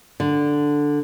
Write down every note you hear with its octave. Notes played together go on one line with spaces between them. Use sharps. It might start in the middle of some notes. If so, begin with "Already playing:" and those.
D3